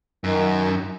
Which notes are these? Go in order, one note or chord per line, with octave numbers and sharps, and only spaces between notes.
F#2 D#3